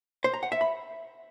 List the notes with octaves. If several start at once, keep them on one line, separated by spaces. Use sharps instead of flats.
C5
A#5
F#5
E5
B5